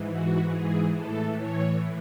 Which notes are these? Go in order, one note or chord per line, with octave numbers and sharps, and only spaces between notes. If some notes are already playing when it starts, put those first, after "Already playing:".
Already playing: G#2 E3
F#4
G#4
A2 E3 A4
C#5